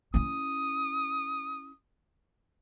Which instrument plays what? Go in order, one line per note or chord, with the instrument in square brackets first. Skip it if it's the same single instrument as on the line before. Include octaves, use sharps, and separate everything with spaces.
[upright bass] C#4 E4 [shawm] D#6